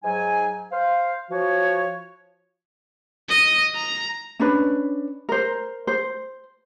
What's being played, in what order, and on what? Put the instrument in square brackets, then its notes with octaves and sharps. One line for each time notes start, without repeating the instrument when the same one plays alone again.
[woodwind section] G#2 F#3 D#4 G#5
C5 F5
F3 F#4 C#5
[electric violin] D#5
A#5
[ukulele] C#4 D4 B4
A#4 C5
C5